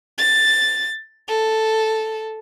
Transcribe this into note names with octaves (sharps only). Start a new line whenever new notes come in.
A6
A4